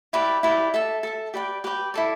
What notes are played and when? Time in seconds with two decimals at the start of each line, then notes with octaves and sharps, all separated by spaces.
0.13 E4 G4 B4 D5
0.43 E4 G4 B4 D5
0.74 A4 E5 A5
1.03 A4 E5 A5
1.34 G4 B4 D5 G5
1.64 G4 B4 D5 G5
1.94 E4 A4 D5